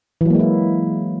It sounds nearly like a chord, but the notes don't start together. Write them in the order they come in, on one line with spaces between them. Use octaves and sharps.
E3 F#3 A#3 G#3 E4